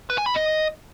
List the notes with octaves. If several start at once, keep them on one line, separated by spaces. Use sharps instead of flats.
B4
G#5
B5
D#5